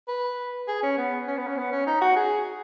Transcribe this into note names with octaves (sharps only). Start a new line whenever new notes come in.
B4
G#4
C#4
B3
C#4
B3
C#4
B3
C#4
D#4
F#4
G#4